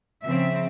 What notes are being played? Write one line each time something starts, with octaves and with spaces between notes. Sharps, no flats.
C#3 F3 C4 E5